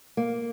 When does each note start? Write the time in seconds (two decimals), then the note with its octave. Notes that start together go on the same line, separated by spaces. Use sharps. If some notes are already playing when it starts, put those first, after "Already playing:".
0.17 A#3